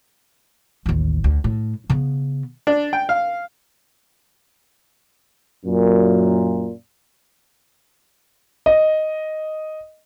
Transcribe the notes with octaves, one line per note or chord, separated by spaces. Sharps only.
A1 D#2
D2
A2
C#3 B3
D4
G5
F5
F#2 A#2
D#5